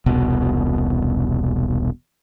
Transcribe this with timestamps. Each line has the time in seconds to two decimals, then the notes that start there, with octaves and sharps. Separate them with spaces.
0.06 E1 C2 B2